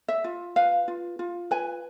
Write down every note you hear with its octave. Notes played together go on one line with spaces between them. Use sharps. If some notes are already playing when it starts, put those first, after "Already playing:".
E5
F4
B4 F5
F4
F4
B4 G#5